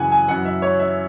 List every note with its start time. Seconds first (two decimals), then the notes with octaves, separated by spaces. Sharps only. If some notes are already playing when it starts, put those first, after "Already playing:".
Already playing: F#2 C#3 E3 F#5 G#5
0.11 G#5
0.28 F#2 E3 F#5
0.45 E5
0.62 C#5
0.79 E5